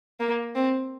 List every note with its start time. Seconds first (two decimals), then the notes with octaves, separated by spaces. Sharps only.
0.20 A#3
0.55 C4